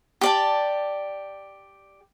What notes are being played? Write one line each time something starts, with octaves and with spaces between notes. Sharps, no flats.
G4 D5 A5